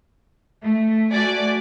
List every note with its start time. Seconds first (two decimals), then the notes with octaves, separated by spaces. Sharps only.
0.62 A3
1.11 A3 F#4 D5 G#5